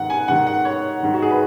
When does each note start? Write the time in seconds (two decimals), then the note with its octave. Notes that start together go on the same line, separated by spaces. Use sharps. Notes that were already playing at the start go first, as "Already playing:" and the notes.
Already playing: G#2 D#3 F#5
0.10 G#5
0.28 G#2 D#3 F#5
0.47 F#5
0.65 C#5
1.02 G#2 D#3
1.14 F#4
1.22 G#4
1.30 B4